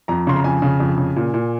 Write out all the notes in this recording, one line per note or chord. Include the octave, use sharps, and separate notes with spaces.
F2 A#5
C#3 C6
A#5
F2 G#5
C#3
F2
C#3
A#2
A#2